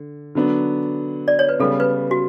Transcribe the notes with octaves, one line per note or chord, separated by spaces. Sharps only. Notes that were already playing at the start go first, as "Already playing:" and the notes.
Already playing: D3
D3 F#3 B3 D4
D5
C#5
B4
C#3 G3 B3 A4
B4
F#4